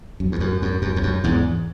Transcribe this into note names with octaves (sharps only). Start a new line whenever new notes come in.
F#2
E2
F#2
F#2
F#2
E2
F#2
E2 G#2